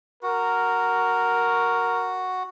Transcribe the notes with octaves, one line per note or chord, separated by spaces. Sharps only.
F#4 A#4